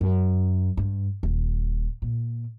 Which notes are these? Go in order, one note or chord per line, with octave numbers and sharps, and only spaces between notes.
F#2
G2
D#1
A#2